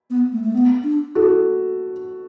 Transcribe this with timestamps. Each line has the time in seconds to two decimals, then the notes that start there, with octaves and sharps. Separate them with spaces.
0.10 B3
0.32 A3
0.43 A3
0.53 B3
0.84 D4
1.15 E4 F#4 A4